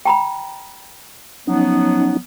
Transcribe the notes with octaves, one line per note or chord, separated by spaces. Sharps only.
G5 A#5 B5
F3 F#3 B3 C#4 D#4